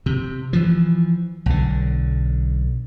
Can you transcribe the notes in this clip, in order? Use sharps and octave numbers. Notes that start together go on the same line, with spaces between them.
C3
E3 F3
B1 D3